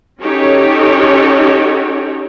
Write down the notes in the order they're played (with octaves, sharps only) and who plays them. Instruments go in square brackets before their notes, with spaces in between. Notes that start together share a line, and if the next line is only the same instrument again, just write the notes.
[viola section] C#4 D#4 F#4 G4 A4 C#5